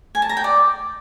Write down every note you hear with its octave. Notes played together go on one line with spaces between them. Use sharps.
G#5
A5
A#5
G5
D5